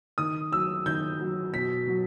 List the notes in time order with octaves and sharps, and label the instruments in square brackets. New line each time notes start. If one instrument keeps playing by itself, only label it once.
[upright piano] D#3 D#6
F#3 E6
D#3 G6
F#3
B2 B6
F#3